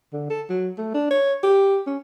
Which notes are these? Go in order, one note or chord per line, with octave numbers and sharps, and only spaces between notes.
D3
A4
F#3
A3
D4
C#5
G4
C#4